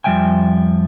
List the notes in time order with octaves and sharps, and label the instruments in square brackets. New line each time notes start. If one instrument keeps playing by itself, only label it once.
[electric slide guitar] F2 F3 G3 E5 G5 G#5